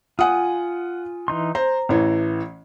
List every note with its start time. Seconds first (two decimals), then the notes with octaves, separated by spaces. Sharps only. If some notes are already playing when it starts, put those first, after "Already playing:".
0.19 F4 F#5 G#5 D#6
1.28 E3 D#4 C6
1.55 C5 A#5
1.89 A1 E3